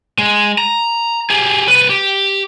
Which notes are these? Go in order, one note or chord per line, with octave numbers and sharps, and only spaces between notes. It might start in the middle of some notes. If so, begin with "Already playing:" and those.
G#3
A#5
G4 G#4
C2 B4
G4